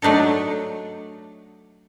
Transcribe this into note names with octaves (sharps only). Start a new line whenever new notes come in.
F#3 A3 D4 D#4 A4